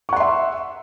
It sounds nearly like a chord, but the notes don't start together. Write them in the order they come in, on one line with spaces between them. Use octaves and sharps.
C#6 F#5 C6 E5